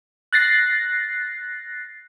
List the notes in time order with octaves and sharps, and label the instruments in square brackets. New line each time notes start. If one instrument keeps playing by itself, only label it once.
[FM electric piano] F#6 A6 A#6 C7